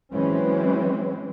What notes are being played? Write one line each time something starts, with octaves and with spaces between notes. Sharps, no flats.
E3 F#3 G#3 C4 C#4